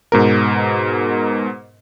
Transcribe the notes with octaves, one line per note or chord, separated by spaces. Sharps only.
G#2 B2 A#4